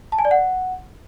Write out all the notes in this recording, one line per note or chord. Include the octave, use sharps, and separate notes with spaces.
A5
G#5
D5
F#5